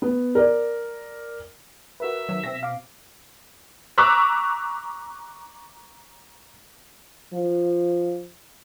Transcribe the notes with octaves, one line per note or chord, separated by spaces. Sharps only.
B3
A#4 D5
F#4 A#4 B4 E5
D#3 F#3 E7
B2 C4 A#6 B6
F5 D6
A#5 C#6 D6 E6 F#6 B6
F3